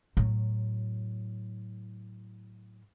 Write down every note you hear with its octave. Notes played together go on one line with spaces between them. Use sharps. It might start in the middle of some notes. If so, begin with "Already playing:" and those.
A2 F#3